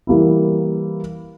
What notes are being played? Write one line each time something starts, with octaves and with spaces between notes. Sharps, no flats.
E3 G3 A#3 E4